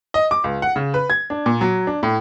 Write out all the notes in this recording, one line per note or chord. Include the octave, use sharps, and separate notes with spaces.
D#5
D6
C#2
F#5
C#3
B4
G#6
D4
A#2
F#3
D4
A2